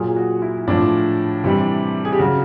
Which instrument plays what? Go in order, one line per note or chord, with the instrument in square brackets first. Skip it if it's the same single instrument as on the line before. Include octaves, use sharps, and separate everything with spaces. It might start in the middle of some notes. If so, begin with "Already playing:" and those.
Already playing: [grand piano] A#2 F#3 G#4
F#4
E4
A2 F3 D4
C3 E3 G3
G#4
G4
C#3 F#3 F#4